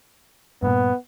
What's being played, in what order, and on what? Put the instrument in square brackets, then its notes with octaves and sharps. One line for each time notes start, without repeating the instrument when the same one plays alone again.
[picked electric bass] G2 A#2 [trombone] B3